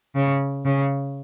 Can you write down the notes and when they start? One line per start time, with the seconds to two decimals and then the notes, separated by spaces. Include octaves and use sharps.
0.16 C#3
0.65 C#3